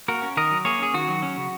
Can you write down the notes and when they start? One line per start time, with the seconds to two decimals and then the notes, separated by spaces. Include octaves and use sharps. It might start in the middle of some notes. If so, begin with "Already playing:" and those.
0.08 A#3 F#4 A#4
0.22 C#4
0.37 D#3 A#4 D#5
0.51 F#3
0.65 A#3 G#4 C#5
0.79 C#4 G#4
0.94 D#3 F#4
1.08 F#3
1.23 C#4
1.37 C#3